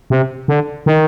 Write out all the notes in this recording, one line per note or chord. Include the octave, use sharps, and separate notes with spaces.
C3
D3
D#3